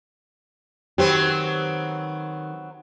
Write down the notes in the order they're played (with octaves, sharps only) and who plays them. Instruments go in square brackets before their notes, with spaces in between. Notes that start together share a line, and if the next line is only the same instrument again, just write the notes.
[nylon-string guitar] D#3 G4 [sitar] F#3 B3 C4